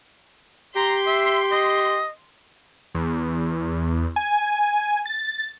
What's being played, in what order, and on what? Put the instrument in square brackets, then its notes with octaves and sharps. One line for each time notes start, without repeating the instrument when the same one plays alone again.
[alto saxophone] G4 [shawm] A#5 [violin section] C6
[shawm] E5
D#5
[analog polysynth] E2
G#5
A6